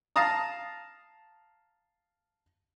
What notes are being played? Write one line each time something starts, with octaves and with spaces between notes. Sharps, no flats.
F5 A5 A#5 D#6